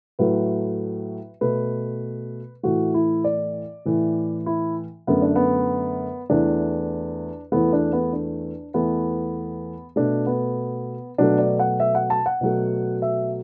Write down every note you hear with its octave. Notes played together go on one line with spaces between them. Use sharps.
A2 F#3 A3 B4
B2 A3 B4
A2 E3 A3 F#4
E4
D5
A2 E3 A3
E4
F#2 D3 A3 B3
D4
B3
E2 E3 A3 D4
E2 E3 A3 B3
D4
B3
D4
E2 E3 A3 B3
B2 A3 D4
B3
B2 F#3 A3 D4
D5
F#5
E5
F#5
A5
F#5
B2 F#3 A3
E5